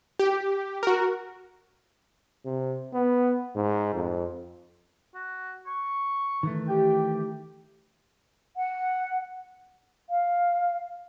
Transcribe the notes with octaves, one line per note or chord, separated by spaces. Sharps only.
G4
F#4 A#4
C3
B3
G#2
F2
F#4
C#6
D#3 E3 A3
G4 G5
F#5
F5